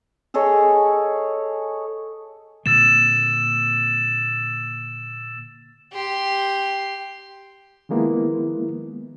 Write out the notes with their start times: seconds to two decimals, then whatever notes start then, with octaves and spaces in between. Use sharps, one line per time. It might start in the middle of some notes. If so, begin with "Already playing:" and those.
0.34 G#4 A4 C#5 D#5
2.66 A#2 D3 A#3 E6 A6 E7
5.93 G4 C6
7.89 D#3 F3 G#3 A#3 B3 E4